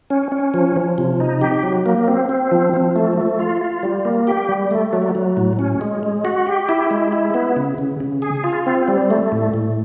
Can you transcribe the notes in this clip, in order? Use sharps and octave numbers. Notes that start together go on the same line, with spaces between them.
C#4
C#4
F3
F3
C3
D#4
G4
F#3
A#3
C4
C4
F3
F3
A3
A3
F4
F4
G3
A#3
G4
G3
A3
F#3
F#3
A2
C#4
G#3
G#3
F#4
G4
E4
G#3
E4
B3
C#3
C#3
C#3
G#4
F4
C4
G3
A3
A2
A2